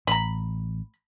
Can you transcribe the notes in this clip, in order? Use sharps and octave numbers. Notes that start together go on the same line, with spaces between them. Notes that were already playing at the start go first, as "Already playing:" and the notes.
A1 A#5 B5